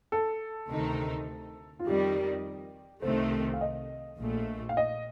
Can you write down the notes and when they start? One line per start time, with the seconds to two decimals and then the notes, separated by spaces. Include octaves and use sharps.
0.12 A4
0.70 D2 C3 D#3 A3 D#4
1.79 F4
1.86 F2 D#3 G3 G4
3.02 C2 C3 D#3 A3 C5
3.54 F5
3.61 D#5
4.18 A#1 A#2 A3
4.69 F5
4.77 D#5